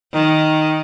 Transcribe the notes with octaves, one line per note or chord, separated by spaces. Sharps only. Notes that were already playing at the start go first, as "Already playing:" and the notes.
D#3